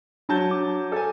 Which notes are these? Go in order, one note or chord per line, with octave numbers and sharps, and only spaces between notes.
F#3 D4 A5 G6
D6
A4 G#5